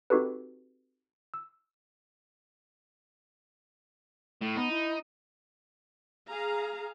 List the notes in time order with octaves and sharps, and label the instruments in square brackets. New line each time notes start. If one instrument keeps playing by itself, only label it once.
[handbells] C4 D#4 F#4 G4 A4 B4
E6
[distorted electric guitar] A2
[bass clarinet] B3 [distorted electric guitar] D#4
[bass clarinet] E4
[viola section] G#4 F5 A#5